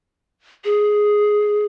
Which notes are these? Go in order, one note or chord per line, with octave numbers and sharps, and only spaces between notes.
G#4